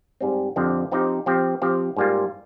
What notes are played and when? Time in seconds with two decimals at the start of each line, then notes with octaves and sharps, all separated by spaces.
0.21 G#2 G3 C4
0.56 F2 D3 F3 C4 G4
0.92 F3 C4 D#4 G4
1.26 F3 C4 G4
1.62 F3 C4 G4
1.97 G#2 G3 A#3 F4